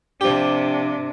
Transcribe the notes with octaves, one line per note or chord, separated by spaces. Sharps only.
C3 F3 D4 G4